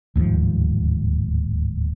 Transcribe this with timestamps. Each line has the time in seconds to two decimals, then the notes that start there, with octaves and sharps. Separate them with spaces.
0.15 D1 D#2 G#2 F3